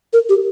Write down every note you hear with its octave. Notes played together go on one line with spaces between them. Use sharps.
A#4
G4